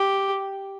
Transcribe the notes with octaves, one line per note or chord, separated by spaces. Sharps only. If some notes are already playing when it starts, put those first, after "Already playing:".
Already playing: G4